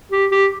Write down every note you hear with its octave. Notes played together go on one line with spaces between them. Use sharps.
G4
G4